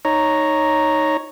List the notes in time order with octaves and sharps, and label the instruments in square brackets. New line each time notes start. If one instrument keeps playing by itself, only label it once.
[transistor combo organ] D#4 C#5 A#5